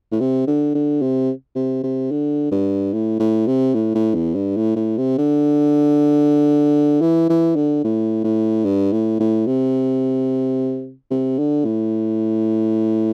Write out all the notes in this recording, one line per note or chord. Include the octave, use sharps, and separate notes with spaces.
A2
C3
D3
D3
C3
C3
C3
D3
G2
A2
A2
C3
A2
A2
E2
G2
A2
A2
C3
D3
E3
E3
D3
A2
A2
G2
A2
A2
C3
C3
D3
A2